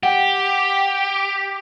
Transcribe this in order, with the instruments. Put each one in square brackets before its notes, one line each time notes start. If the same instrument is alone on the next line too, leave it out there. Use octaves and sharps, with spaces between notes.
[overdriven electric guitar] G4 [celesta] F#5 G5